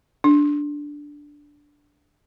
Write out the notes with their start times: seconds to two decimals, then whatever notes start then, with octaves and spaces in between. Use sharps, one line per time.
0.24 D4